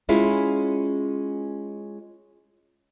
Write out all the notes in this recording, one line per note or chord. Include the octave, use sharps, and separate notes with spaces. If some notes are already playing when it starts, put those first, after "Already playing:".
G#3 C#4 E4 F4 G#4